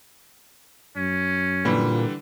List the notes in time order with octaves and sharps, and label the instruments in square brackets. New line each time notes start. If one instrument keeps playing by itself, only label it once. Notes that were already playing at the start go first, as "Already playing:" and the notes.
[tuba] F#2 [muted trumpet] C#4
[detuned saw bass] A#2 [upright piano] D3 E3 G3